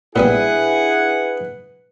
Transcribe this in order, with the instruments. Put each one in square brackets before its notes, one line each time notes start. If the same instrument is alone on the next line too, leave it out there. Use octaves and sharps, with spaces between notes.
[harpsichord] A#2 G3 B3 [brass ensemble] D4 E4 G#4 [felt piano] B4 [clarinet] F#5